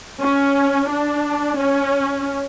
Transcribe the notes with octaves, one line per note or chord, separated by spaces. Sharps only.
C#4
D4
C#4